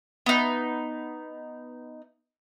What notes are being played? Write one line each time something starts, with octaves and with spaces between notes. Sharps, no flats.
B3 D#4